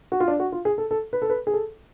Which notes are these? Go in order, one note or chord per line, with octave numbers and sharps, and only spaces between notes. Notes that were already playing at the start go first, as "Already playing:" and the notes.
F#4
F4
D4
F#4
F4
G#4
A4
A4
B4
A4
B4
G#4
A4